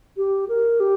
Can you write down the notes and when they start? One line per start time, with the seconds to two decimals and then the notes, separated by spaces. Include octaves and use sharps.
0.17 G4
0.49 A#4
0.80 G4